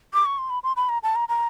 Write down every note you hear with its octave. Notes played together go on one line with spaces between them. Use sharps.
D6
C#6
C6
B5
C6
B5
A#5
A5
A#5
A#5